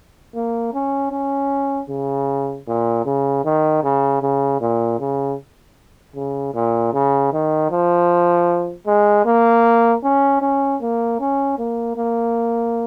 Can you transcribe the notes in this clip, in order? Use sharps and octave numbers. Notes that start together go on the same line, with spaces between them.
A#3
C#4
C#4
C#3
A#2
C#3
D#3
C#3
C#3
A#2
C#3
C#3
A#2
C#3
D#3
F3
G#3
A#3
C#4
C#4
A#3
C#4
A#3
A#3